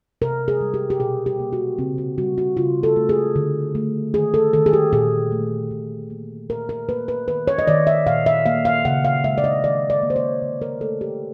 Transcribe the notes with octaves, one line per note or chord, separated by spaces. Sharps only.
C3 A#4
G#4
G3
G4
G4
B2 G#4
G4
A#3
F#4
C#3 C4
F#4
G3 F#4
F#4
C#3 F4
A4
A3
G#4
D3
A3
D#3 G#4
A4
D#3 A4
G#4
G4
A#2 G#4
A3
A#2
A#3
A#2 A#4
A#4
A#3 B4
B4
D#3 B4
C#5
D#5
D#3 D5
E5
A#2 F5
E5
A#3 F5
F5
C#3 F#5
F5
G#3 E5
D5
D#5
D#3 D5
D5
A#3
C5
C#5
D3
A#4
A3 A4
G4